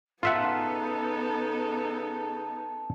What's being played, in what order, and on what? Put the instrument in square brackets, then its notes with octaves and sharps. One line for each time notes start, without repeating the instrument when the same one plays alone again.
[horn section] C#3 A4 [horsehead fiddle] B3 D#4 [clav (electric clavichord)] F4 E5 F#5 [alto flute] A5